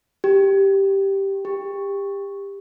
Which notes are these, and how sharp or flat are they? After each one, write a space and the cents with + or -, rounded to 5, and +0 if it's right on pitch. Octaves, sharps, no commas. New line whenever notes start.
G4 -5
G4 +25